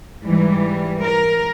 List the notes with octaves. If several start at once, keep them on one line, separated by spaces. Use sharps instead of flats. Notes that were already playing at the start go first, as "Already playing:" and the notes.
G#2 E3 G3
A#4